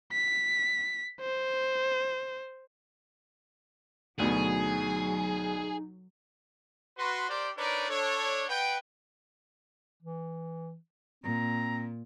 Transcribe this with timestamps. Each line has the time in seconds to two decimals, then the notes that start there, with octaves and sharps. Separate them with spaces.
0.12 B6
1.20 C5
4.19 D2 B2 F#3 D#4 G#4
6.97 F#4 B4 C6
7.28 G4 A#4 C5 D5
7.57 D4 D#4 A#4 B4 C#5 D5
7.89 D4 A4 C#5
8.48 B4 D#5 F#5 G5
10.03 E3
11.24 A#2 C4 A#5